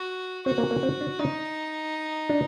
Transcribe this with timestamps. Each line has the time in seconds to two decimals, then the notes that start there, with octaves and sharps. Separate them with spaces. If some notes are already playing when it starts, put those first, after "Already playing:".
Already playing: F#4
0.46 C4 F#4
0.58 A#3
0.71 A#3
0.83 C4
1.01 D4
1.19 D4 D#4
2.29 D4